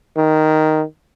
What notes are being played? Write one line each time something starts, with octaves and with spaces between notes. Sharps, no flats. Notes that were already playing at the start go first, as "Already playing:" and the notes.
D#3